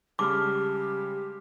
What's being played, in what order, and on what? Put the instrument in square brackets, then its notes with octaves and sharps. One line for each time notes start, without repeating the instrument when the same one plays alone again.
[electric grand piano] C#3 G3 G#3 [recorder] G4 [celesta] A5 F6 [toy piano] D6